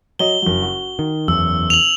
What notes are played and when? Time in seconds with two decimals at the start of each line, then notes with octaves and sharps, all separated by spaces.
0.19 F#3 C#5 D#5 G7
0.42 F#1 F#3
0.62 F#4
0.99 D#3
1.28 F#1 E2 E6
1.70 F7 F#7